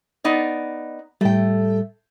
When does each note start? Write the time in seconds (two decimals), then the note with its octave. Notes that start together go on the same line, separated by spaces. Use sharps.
0.24 B3 D#4 D5
1.21 A2 G3 A3 G5